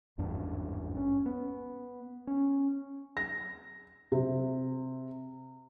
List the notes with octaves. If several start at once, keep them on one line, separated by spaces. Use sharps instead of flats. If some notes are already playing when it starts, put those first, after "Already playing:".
G#1 E2 G2 D4
C#4
B3
C#4
A#6
C3